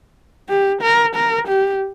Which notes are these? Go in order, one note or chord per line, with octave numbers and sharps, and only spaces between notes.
G4
A#4
A#4
G4